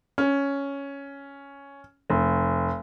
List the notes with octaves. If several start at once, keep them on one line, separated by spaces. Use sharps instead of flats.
C#4
F1